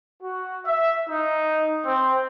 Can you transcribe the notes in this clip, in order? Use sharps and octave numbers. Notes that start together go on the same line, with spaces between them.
F#4
E5
D#4
C4